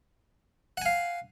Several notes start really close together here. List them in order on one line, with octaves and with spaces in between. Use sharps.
F#5 G#5 F5